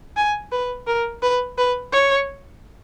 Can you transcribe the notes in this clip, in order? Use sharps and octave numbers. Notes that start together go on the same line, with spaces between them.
G#5
B4
A#4
B4
B4
C#5